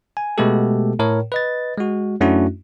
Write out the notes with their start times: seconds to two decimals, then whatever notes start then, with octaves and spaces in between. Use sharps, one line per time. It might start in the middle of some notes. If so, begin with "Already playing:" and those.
0.17 G#5
0.38 B2 G#3 A3 B3 G4 A4
0.99 A2 A#4 C#5
1.32 B4 D#5 A6
1.78 G#3 F#4
2.21 F#2 A3 C#4 D4 E4 F#4